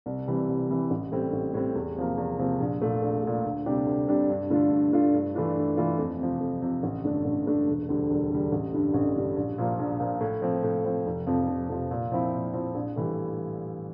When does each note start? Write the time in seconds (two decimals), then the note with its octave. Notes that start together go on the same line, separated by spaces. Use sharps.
0.06 C2
0.27 C3 E3 G3
0.48 C2
0.69 C3 E3 G3
0.90 A1
1.12 A2 G3 C4
1.33 A1
1.54 A2 G3 C4
1.75 E2
1.96 C3 F3 A#3
2.17 E2
2.39 C3 F3 A#3
2.60 A#1
2.81 A#2 A3
3.02 A#1
3.23 A#2 A3
3.44 D2
3.66 C3 G3 D4 G4
3.86 D2
4.08 C3 G3 D4 G4
4.30 G2
4.50 D3 A3 D4 F4
4.71 G2
4.92 D3 A3 D4 F4
5.14 G2
5.35 E3 A3 D4 F4
5.56 G2
5.77 E3 A3 D4 F4
5.98 F2
6.19 C3 F3
6.40 F2
6.62 C3 F3
6.83 A1
7.04 G2 D3 A3 D4
7.25 A1
7.46 G2 D3 A3 D4
7.67 E1
7.88 D2 D3 G3
8.10 E1
8.31 D2 D3 G3
8.52 A1
8.73 G2 D3 G3
8.94 A1
9.16 G2 D3 G3
9.36 A#1
9.58 A#2 F3 A#3
9.79 A#1
10.00 A#2 F3 A#3
10.21 A2
10.42 F3 C4
10.63 A2
10.85 F3 C4
11.06 F1
11.27 F2 C3 F3
11.49 F1
11.69 F2 C3 F3
11.91 A#2
12.12 F3 C4 E4
12.33 A#2
12.53 F3 C4 E4
12.74 A#1
12.96 A2 E3 G3